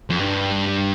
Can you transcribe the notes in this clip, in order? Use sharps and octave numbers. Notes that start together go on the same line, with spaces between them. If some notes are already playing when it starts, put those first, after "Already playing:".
F2
G2